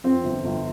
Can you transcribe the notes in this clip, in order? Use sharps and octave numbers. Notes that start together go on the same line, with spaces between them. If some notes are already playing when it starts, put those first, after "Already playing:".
F2 C4
G1
G1